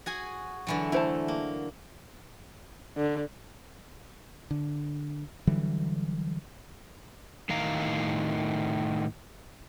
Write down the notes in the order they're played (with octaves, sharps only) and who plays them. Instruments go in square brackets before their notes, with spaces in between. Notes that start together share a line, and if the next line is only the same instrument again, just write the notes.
[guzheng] F#4 G#4 G#5
D3 E3 F#3
[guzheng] A3 [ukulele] E4 C5 A5
[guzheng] A#3
[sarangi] D3
[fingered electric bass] D3
D3 E3 F#3 G3
[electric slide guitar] A2 D#3 F5 A#5